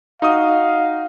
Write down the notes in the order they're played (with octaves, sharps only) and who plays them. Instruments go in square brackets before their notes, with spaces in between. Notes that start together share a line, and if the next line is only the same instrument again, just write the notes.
[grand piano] D#4 F#4 D#6 [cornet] F5